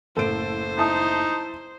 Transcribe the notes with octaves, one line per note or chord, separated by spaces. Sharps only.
F#1 A2 A4 C5 D7
D#4 E4 A5 D#6